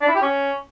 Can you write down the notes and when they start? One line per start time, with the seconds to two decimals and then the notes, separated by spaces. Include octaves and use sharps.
0.01 D4
0.08 E4
0.15 G4
0.22 C#4